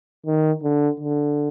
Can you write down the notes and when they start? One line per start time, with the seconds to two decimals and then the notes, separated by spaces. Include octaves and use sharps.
0.26 D#3
0.63 D3
1.00 D3